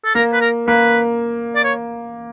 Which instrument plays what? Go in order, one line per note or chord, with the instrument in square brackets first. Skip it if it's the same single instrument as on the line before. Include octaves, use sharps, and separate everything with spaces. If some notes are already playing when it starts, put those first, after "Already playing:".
[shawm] A4
[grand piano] A#3 [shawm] A#4
[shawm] B4
A#4
[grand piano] A#3 [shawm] B4
[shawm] D5
C#5